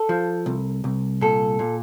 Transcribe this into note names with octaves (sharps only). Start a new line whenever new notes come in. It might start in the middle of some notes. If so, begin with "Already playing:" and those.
Already playing: A4
F3
C2
C2
A#2 A4
A#2